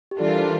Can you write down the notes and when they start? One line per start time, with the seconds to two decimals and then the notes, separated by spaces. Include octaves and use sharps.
0.11 G4
0.18 E3 G3 D4 F4 A4
0.28 A#4
0.38 C5